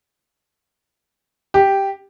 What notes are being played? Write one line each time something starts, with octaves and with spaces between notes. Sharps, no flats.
G4